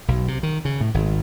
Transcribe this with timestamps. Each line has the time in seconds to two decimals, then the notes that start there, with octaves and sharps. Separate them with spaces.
0.08 B1
0.28 C3
0.43 D#3
0.65 C#3
0.81 A2
0.94 G#1